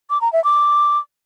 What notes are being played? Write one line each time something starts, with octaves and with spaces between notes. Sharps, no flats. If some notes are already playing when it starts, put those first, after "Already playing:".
D6
A#5
E5
D6